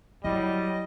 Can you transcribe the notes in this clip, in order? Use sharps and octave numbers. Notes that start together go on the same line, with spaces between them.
F#3 G3 E4 D#5